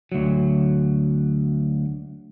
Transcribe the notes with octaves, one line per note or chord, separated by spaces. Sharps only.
D2 F#3